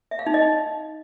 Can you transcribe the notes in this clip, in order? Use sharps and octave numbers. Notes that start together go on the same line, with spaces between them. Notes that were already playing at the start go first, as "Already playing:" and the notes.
E5
F5
D#4
D#5
D#4